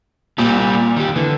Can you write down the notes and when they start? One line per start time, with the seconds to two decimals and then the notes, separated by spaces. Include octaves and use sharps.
0.38 A#2 G3 C4
0.96 D#3 G4
1.16 D3 E3